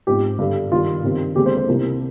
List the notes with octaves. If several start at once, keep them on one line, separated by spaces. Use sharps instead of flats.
G#2 F3 C4 G4
G2 D3 G3
G2 D#3 G3 F4
G2 D#3 G3 C4
D#2 D3 G#3 C4 G4
C5
C5
C2 C3 G3 A#3